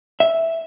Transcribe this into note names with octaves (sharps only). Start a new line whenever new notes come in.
E5